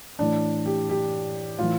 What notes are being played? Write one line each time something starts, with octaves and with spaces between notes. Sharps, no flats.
A2 E3 D4
G4
G4
A2 E3 F4